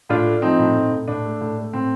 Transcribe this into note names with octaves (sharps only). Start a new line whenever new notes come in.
A2 D4 F4
A3
F3 C4 D#4
A2
A2
A2
A2 D4
A3
A2
A3
A2 C4